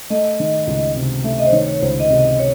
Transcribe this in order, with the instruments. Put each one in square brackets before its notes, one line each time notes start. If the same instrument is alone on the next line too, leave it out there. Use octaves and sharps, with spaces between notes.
[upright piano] A3 [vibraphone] D#5
[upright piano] D#3
C#2
C3
[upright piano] A3 [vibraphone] E5
[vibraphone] D#5
C5
[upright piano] D#3 [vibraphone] C#5
[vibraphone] C#5
[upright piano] C#2 [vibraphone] C5
[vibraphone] D#5
[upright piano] C3
[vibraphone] D#5
C#5